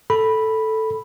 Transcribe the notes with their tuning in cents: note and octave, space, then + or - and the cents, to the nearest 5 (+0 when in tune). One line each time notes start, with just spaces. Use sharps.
A4 +0 B5 -5